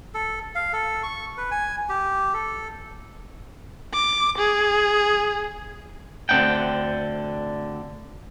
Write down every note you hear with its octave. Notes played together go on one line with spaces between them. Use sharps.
A4
F5
A4
C#6
B4
G#5
G4
A4
D6
G#4
D2 D3 C4 D#4 F#5 G5